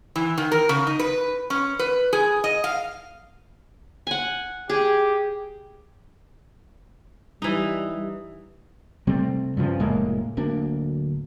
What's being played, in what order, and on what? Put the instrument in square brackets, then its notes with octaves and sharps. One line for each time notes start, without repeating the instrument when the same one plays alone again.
[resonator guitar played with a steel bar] E3
D#3
A#4
C#3
D#4
B4
C#4
B4
G#4
D#5
F5
[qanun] F#5 G#5
[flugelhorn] G4 [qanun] G#4
[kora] E3 D#4 [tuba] G3
[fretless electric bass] C3 G3 A3 C4
G2 C#3 F3
F1 A2 G#3 A#3
D1 D2 A#3 D4